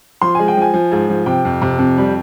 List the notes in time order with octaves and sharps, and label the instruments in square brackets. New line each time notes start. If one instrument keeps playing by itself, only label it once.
[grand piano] F3 C6
G#3 G#5
G5
F3 G#5
F3
G#2
F3
C3 G5
F2
C3
F2
G3